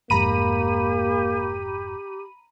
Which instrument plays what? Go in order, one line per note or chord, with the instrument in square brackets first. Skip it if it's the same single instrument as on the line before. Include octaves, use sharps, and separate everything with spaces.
[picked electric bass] F1 F2 G#2 [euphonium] A#3 [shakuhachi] G4 [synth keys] A#5 B5 D#7